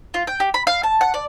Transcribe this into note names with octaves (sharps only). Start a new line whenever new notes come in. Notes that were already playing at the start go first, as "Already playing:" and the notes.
F4
G5
G4
B5
F5
A5
F#5
D5